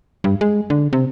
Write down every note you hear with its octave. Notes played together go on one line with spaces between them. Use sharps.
G2
G#3
D3
C3